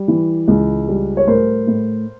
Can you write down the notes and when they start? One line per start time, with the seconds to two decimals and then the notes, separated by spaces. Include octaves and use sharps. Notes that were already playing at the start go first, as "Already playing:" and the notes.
Already playing: G3
0.08 E3
0.48 C#2
0.88 G3
1.17 C#5
1.27 A2 A#4 C5
1.67 A2